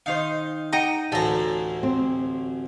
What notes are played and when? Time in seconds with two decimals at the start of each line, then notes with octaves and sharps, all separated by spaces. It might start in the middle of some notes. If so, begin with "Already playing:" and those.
0.06 D#3 D#4 C5 F5
0.72 D#4 D#5 F#5 G5 A#5
1.12 A1 D2 C#4 A4 A#5
1.83 C4